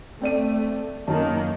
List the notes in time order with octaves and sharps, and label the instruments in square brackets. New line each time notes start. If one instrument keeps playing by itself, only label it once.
[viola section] A3 [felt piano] C4 D5 D#7
[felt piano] F#2 A5 [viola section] D#3 A#3